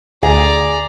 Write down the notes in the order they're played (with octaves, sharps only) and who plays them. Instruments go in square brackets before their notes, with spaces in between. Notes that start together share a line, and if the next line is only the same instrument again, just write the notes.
[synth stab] D2 [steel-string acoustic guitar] G#4 [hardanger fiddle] D5 A#5